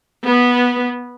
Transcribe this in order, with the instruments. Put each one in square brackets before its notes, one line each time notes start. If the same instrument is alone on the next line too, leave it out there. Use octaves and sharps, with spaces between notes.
[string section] B3